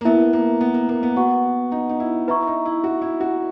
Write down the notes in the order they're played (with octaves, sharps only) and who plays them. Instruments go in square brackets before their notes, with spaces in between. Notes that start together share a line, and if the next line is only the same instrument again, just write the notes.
[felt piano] A#3
[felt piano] B3 [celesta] E4 A#4 E5
[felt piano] A#3
B3
A#3
A#3
B3
[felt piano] B3 [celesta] F#4 B4 F#5 C#6
[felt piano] D#4
D#4
E4
[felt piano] E4 [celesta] B4 E5 A#5 C#6
[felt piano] D#4
E4
F#4
E4
F#4